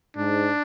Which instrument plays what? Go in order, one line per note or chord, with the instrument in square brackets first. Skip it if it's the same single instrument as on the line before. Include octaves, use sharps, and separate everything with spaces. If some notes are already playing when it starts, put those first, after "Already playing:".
[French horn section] G#2 [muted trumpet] D4